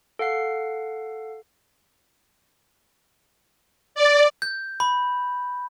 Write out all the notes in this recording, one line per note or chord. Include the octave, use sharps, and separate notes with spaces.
A4 F5 F#5 C7
D5
G6
B5